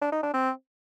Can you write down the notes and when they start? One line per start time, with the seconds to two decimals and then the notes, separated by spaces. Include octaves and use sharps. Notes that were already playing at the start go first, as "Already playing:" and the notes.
0.01 D4
0.12 D#4
0.23 D4
0.34 C4